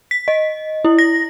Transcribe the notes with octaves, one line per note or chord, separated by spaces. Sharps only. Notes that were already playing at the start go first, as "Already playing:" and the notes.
B6
D#5
E4
A#6